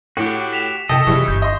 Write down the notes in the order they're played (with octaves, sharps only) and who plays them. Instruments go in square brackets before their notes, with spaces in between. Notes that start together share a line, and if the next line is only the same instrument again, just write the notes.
[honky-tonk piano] A2 [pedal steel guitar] F#4 G4
[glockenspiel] B6 E7 F7
[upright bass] C3 [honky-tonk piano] A4 G5 [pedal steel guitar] D#5
[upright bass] C3 F4 [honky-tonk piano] E3 G3 G#3 [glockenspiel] C#6
[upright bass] G1 [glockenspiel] C#6 G6
[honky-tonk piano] D#5 C6